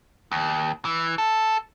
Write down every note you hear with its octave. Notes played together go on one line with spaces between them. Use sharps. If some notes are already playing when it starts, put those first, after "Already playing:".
D#2
E3
A4